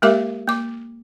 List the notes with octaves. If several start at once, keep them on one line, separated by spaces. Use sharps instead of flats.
G#3 A#3 G4 A#4 E5 D6
A#3 D6